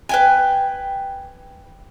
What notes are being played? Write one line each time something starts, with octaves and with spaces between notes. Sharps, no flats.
B4 G5 G#5